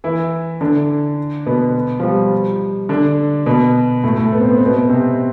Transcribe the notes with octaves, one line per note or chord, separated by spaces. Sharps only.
E3 E4
D3 D4
B2 B3
F3
G3
D3 D4
B2 B3
A2 A3
A2 A3
B3
C4
B3
C4
B2 B3
C3 C4